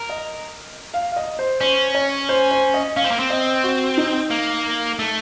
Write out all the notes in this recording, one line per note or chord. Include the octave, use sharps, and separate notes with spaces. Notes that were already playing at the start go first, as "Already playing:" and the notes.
Already playing: A#4
D#5
F5
F5
D#5
C5
C#4 C5
C#5
C5
C5
D#5
C#4 F5
C4
A#3
C4
D#5
F#4
D#4
A#3
A3